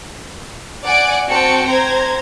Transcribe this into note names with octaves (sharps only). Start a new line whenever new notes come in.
D5 F#5 G#5 D7
C4 F#4 G5 A5 C#7
C5 A#5 G#6